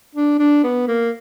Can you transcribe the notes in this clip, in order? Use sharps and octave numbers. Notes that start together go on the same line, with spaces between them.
D4
D4
B3
A#3